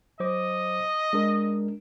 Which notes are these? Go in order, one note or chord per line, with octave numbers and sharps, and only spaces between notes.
F#3 C5 D#5 D6
G#3 D4 A#4